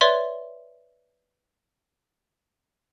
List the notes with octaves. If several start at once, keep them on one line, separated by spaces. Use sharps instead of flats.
B4 C#5 D5 E5 C6